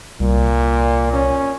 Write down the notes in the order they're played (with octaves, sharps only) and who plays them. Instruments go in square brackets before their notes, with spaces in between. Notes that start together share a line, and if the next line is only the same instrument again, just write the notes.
[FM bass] C2 [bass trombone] A#2
[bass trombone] C#4